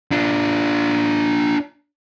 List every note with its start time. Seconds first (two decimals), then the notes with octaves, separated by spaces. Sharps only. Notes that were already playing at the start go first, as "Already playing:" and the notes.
0.11 D4 F4